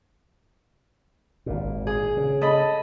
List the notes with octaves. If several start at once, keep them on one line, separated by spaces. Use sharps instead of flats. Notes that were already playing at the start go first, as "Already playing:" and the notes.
G#1 A#2
G#4
C#3
A4 D#5 B5